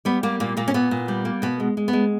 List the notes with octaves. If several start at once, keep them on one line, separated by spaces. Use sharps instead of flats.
G3 B3
G3 A#3
A#2 A#3
A#2 A#3
C#4
A#2 B3
A#2
G3
A#3
B2 B3
G#3
G#3
B3
G#3